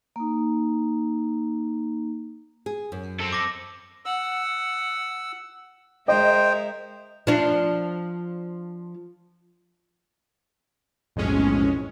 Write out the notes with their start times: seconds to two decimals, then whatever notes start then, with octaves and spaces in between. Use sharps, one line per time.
0.16 A#3 D#4
2.66 G#4
2.92 F#2
3.20 C4 A4
3.32 D6 A#6
4.05 F#5 E6
6.08 G#3 A#4 C5 D#5 E5 G5
7.27 F3 D4
11.16 B1 F2 A2 G#3 C#4